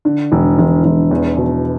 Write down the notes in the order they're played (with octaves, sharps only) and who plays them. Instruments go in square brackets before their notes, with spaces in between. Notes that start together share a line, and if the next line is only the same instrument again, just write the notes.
[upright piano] D3
E1
E1
E1
E2
B2